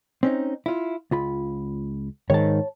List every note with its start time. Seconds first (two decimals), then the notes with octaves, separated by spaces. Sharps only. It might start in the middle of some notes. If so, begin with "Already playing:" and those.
0.23 C4 C#4 D#4
0.66 E4 F4
1.11 C#2 F4 B5
2.30 G#2 D#3 C#5 A5